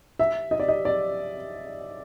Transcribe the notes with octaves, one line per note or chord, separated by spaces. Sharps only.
E5
D#5
D5
D#5
D5